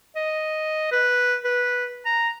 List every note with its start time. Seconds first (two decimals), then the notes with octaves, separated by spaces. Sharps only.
0.16 D#5
0.92 B4
1.44 B4
2.06 A#5